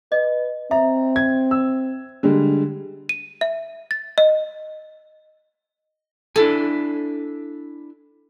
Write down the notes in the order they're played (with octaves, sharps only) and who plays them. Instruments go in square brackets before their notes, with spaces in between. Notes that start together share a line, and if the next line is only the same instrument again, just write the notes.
[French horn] B4 [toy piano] D#5
[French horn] C4 [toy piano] E5 [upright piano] A#5
[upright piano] G#6
E6
D3 G3 G#3
[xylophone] D#7
E5
A6
D#5
[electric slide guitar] D4 E4 G#5 [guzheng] A4